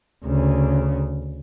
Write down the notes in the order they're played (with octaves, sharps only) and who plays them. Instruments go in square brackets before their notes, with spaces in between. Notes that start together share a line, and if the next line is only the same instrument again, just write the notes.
[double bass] D2 C#3